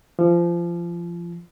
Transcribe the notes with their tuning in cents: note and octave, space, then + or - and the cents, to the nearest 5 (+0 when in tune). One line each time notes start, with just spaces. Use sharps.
F3 -25